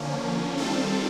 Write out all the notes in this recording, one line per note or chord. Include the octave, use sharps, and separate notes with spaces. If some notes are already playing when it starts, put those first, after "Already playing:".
Already playing: D3 F3 A#3 C#4
D#3 G3 C4 F4 A4